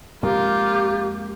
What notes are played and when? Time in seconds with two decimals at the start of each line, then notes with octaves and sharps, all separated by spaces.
0.23 F2 G#3 A#3 F4 G4 A#4